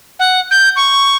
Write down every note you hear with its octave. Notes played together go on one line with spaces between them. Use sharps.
F#5
G6
C#6